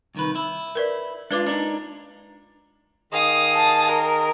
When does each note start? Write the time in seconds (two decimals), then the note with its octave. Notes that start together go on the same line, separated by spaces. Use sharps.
0.15 C2 D#3 B4
0.35 E4
0.75 A#4 B4 D5
1.31 G#3 D4 F4 B4 D6
1.46 D4 D#4 A#4
3.12 D#3 G#4 D#5 F5 D#6
3.57 A5
3.92 A#4